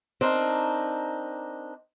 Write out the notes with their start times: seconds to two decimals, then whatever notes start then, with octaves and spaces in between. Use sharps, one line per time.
0.21 C4 D4 D#4 A#4